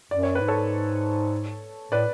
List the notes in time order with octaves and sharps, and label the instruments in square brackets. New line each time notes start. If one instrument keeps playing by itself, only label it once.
[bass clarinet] F#2 [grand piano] D5
[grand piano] C#5
B4
[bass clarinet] G#2
[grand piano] A4 C#5
[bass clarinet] A2 [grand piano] B4 D5